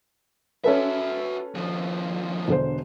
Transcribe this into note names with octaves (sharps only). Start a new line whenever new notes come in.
C#4 F#4 A4 B4 E5
D#2 F3
E1 D3 C5